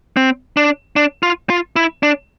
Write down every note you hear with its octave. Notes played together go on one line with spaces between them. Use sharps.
C4
D4
D4
F4
F4
E4
D4